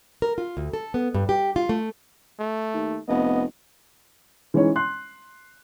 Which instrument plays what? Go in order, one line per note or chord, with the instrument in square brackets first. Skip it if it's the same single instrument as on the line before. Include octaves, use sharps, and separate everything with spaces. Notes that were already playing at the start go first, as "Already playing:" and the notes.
[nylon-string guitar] A#4
F4
D2
A4
B3
G2
G4
F4
A3
[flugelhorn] A3
[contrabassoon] D#2
[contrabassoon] F1 [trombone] B3 [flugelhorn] D#5
[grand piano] E3 G#3 C#4 D#4 C#5
C6 F#6